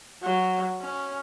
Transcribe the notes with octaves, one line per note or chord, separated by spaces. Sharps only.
F#3
C#4